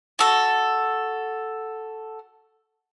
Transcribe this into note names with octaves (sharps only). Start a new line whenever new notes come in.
F#4 A4